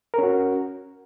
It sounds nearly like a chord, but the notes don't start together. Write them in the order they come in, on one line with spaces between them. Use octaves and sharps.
A#4 C#4 F#4